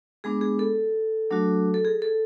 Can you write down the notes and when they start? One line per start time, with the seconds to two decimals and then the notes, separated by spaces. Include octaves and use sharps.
0.24 G#3 B3 D4 G#4
0.41 G#4
0.59 A4
1.31 F#3 A3 D4 F#4
1.74 A4
1.85 G#4
2.02 A4